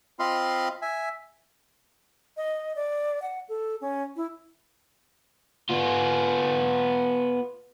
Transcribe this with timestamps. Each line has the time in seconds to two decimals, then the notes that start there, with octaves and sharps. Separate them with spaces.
0.19 C4 F4 D#5 F5 B5 C6
0.82 E5 G#5
2.37 D#5
2.76 D5
3.22 F#5
3.49 A4
3.81 C#4
4.16 E4
5.69 B3 F4